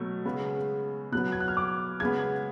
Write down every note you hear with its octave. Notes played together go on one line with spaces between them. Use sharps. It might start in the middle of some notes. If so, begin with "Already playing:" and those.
Already playing: B2 F#3 A3
C#3 G#3 B3
B2 F#3 B3 F#6
G#6
F#6
F6
D6
C#3 G#3 B3 G#6